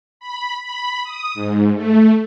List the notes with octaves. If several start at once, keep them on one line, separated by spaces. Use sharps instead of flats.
B5
B5
D#6
G#2
A3